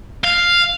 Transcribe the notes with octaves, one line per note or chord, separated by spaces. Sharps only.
F5